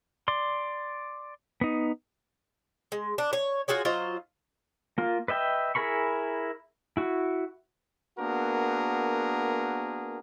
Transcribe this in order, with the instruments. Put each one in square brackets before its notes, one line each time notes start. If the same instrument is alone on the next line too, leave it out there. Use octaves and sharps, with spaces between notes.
[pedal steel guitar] D5 C6
B3 D#4
[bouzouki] G#3
D4
C#5
F4 F#4 G#4 C#5
F#3 F4 C5 D#5
[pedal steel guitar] A#3 F4
B4 D#5 E5 G5
E4 G#4 A#4 B5 C#6
E4 F#4
[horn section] A#3 B3 D4 F#4 G#4 A#4